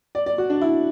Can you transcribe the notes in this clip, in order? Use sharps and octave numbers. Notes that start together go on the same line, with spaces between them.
D5
D5
F#4
D4
E4